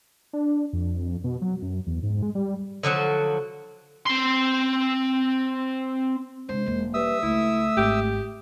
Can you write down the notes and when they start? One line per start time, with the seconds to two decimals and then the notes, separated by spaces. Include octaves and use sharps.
0.33 D4
0.73 F2
0.98 F2
1.24 B2
1.42 F#3
1.62 F#2
1.87 E2
2.03 G#2
2.22 G#3
2.35 G3
2.83 D3 F3 F#3 F#4
4.06 C4 C6
6.49 C3 G#3 D4 C5
6.66 E1 A#3
6.94 G3 B4 E5 D#6 E6
7.22 C#2 A3 E4
7.77 G#1 G#2 G4